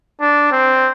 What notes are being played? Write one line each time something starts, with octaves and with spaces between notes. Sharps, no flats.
D4
C4